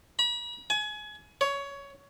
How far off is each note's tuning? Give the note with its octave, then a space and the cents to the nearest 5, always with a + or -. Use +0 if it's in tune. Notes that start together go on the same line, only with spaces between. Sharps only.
B5 -40
G#5 +30
C#5 +15